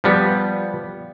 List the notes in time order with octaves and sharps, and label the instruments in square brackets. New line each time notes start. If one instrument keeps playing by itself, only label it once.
[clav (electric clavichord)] F3 G3 B3